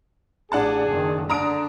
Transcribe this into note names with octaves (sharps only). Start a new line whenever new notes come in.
A1 D4 G#4 F#5 A5
F#1 D#3
D3 D4 A#5 D#6 D7